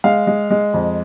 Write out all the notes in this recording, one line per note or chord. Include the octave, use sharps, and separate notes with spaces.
G#3 F5
G#3
G#3
F2